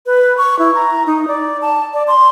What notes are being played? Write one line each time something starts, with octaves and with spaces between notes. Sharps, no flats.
B4
C#6
E4
A#5
D#4
D5
A5
D5
C6